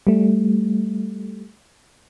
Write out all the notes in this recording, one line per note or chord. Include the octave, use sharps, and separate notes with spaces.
G3 A3